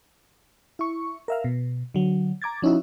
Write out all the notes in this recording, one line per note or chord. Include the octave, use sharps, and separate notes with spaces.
E4 C#6
A#4 E5 F5
B2
D3 F#3
A#5 D6 G#6 A6
F3 C#4 D#4 E4 F#4